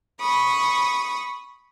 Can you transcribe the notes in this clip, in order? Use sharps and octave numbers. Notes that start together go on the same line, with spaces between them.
B5 C#6 D#6